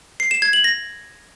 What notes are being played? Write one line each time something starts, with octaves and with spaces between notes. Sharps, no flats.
C7
E7
G#6
F#7
A#6